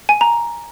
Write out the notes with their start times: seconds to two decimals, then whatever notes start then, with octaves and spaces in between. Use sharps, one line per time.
0.09 G#5
0.21 A#5